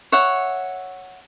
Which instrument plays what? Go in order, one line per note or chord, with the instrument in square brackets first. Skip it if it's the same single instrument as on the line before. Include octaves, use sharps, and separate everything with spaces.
[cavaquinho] C#5 E5 F#5